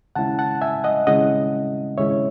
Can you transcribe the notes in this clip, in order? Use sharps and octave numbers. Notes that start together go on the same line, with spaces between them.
D#2 C#3 G#3 C#4 E4 F#5 A5
F#5 A5
E5 G#5
D#5 F#5
D#2 C#3 G#3 C#4 E4 D#5 F#5
D#2 C#3 G#3 C#4 E4 C#5 E5